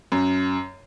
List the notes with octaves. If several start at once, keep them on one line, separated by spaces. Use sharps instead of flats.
F#2